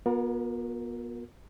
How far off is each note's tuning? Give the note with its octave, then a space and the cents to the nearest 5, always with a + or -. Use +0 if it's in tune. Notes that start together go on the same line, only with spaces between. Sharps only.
B3 -35 F4 +45 A#4 +0